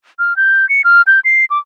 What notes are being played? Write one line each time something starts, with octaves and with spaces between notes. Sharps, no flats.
F6
G6
C#7
F6
G6
C7
D6